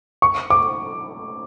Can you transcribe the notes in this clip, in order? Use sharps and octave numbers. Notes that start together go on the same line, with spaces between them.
C#6
D6